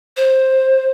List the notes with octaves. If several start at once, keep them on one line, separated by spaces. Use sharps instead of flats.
C5